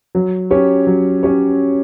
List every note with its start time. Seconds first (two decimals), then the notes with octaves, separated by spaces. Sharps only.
0.15 F#3
0.51 C#4 G4 C#5
0.87 F#3
1.23 C#4 G4 C#5